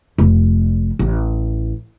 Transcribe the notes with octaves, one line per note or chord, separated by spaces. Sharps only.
F1
A1